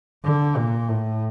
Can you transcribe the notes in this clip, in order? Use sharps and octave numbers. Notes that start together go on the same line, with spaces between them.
D3
A#2
A2